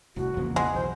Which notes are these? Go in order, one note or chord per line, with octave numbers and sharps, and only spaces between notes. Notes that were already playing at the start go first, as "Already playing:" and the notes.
E1 C2 A2 F#4
A#1 E2 C#3 E3 F3 A#3
G#3 F#5
B1 C5